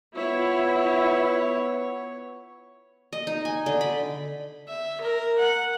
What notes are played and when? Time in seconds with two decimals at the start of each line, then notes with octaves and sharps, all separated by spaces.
0.16 B3 E4 F4 C#5
3.13 D#5
3.27 D#4
3.45 G#5
3.66 D3
3.81 B5
4.68 E5
5.01 A#4
5.38 F#5